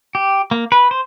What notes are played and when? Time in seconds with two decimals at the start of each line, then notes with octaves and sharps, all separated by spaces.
0.15 G4
0.51 A#3
0.72 B4
0.91 C5